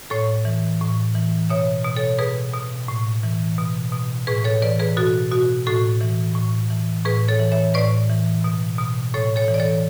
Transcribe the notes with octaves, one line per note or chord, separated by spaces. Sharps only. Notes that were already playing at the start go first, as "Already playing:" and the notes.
A2 A4 C#5
E3
A2
E3
B2 C#5 E5
B2
A4 C#5
B2 G#4 B4
B2
A2
E3
B2
B2
A2 G#4 B4
B4
A4 C#5
E3 B4 D5
G#4 B4
B2 F#4 A4
B2 F#4
A2 F#4 A4
E3
A2
E3
A2 G#4 B4
A4 C#5
E3
C#5 E5
A2 B4 D5
E3
B2
B2
A2 A4 C#5
A4 C#5
E3
D5
A4 C#5